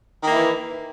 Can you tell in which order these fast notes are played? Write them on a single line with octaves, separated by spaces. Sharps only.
D#3 A#3 E4 E3